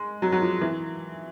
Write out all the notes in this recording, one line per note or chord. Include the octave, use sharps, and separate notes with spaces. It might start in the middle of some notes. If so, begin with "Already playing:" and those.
Already playing: G#3
F#3
F#3
F3
E3